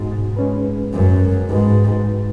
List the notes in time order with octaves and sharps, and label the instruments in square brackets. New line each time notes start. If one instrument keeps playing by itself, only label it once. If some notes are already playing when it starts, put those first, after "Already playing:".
Already playing: [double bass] G#2 [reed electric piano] B2 G#3 D#4 F#4
[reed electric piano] G#3 C#4 B4
[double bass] F#2
[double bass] G#2 [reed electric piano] G#3 D#4 F#4 B4